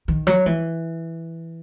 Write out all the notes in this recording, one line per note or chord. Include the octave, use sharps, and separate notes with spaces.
D#3
F#3
E3